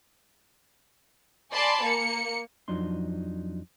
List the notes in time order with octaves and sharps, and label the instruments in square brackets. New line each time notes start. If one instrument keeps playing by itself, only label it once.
[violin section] D5 G#5 A5 B5 C6
A#3 C#7
[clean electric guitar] F2 F3 F#3 D4 D#4 C6